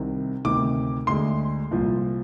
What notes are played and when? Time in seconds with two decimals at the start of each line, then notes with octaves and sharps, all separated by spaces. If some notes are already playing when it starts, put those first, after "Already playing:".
Already playing: C2 C3 D#3
0.45 D2 C3 D#3 D6
1.07 D2 D3 G#3 C6
1.71 C2 A#2 F3